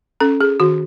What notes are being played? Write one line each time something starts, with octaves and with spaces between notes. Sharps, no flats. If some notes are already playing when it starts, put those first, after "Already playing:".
C#4 A4
G#4
D#3 F#4